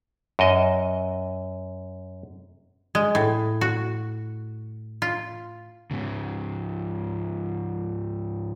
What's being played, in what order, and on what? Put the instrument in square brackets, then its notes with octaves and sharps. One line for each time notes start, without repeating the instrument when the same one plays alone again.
[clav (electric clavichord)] F#2 D#5
[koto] G#3
A2
F#4
F4
[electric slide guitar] G#2 C#3